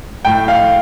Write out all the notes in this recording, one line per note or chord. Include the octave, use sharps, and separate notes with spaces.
A2 G5
F5